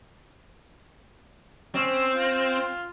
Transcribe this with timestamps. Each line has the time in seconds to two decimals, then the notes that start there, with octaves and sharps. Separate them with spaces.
1.75 C4 C#4
2.15 F4